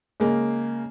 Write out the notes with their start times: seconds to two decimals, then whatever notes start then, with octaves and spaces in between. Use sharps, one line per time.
0.20 C#3 G#3 A#3